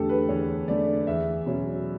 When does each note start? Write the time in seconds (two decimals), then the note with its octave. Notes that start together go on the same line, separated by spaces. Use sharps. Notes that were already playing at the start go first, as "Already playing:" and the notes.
Already playing: E2 D3 A3 G4 A4
0.09 B4
0.29 E2 C#5
0.68 D3 A3 D5
1.07 E2 E5
1.46 B2 F#3 C#4